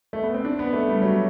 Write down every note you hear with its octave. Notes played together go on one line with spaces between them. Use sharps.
A3
B3
C4
D4
B3
A3
G3
F#3